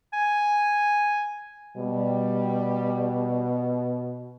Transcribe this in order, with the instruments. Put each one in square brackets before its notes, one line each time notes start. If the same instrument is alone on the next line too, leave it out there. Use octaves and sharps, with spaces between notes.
[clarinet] G#5
[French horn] B2 [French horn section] G3